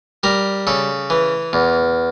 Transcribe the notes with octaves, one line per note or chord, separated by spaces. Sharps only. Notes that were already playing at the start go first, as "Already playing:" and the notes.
G3 A#4
C#3 A4
E3
E2